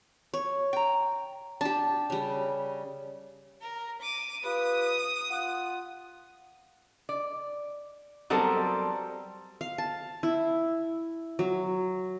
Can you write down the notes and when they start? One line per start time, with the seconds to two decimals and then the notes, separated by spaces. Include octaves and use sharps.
0.34 C#5
0.73 G5 A#5
1.61 D4 G4 A5
2.10 C#3 G3
3.62 A#4
4.02 D6 D#7
4.44 F4 G4 B4 D#6
5.30 F4 F#5
7.09 D5
8.30 F#3 G3 B3 C4 A4 A#4
9.61 F5
9.78 A5
10.23 E4
11.39 F#3